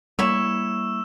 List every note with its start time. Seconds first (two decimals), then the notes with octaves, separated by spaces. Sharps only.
0.19 G3 A3 A#3 E4 C#5 E6 E7